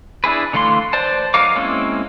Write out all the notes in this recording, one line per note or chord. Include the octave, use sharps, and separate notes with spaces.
D4 E4 G#4 B4
D3 E3 A3 F5 C6
B4 C5 D5 A5
F#3 D#4 A#4 F5 D6
G#3 A#3 C4 C#4 E4